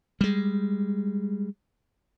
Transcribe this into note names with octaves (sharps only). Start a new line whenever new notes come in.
G3 G#3